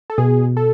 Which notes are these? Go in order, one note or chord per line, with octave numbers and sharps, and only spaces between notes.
A4
B2 G#4
A4